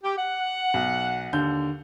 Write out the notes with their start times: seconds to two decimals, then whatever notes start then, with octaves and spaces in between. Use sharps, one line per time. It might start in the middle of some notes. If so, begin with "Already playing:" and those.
0.04 G4
0.17 F#5
0.74 B1
1.33 D#2 D3 G6